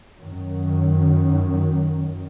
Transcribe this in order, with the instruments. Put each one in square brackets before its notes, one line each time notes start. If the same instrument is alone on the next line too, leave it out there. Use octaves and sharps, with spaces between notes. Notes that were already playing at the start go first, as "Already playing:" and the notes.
[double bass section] F#2 D#3 F#3